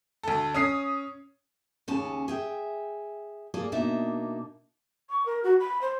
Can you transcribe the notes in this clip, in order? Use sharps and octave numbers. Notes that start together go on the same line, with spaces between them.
D2 A4
C#4 D#6 C7
D#2 C#3 C#4 G#4 A5
G#4 E5 G5
A#3 G#4 A4 D5
B2 A#3 D4 D#4 E5
C#6
A#4
F#4
B5
C5